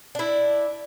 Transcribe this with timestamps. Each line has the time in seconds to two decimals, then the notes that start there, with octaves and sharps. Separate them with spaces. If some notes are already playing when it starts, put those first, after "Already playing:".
0.15 D4 E4